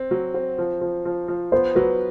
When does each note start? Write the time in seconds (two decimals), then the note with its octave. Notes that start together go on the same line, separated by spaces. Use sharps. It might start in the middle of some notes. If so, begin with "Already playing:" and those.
Already playing: C4
0.11 F#3
0.34 C4
0.58 F3
0.81 F3
1.05 F3
1.28 F3
1.52 B3 C5
1.75 F#3 B4